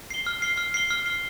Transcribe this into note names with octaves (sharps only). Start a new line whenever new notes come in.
C7 G7
F6
C7 G7
F6
C7 G7
F6
C7 G7